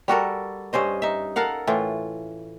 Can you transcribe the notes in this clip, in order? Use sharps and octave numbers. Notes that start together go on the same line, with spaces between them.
G3 F#4 A4 A#4
G2 C#4 C5 D#5
D#4 E5
A4 A#4 F5 F#5
A2 E3 F4